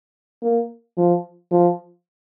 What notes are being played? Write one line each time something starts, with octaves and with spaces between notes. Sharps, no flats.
A#3
F3
F3